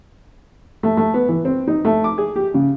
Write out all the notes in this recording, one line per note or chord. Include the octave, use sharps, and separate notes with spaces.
A3
A3
B3
E3
C4
D#4
A3
D6
G#4
G4
C#3